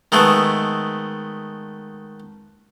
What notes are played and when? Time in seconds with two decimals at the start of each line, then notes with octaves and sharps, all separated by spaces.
0.12 D#3 G#3 A3 B3